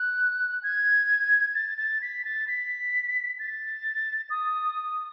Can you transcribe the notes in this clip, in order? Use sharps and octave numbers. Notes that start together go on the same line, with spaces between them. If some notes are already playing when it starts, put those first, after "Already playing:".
Already playing: F#6
G#6
A6
A6
B6
A6
B6
A6
D#6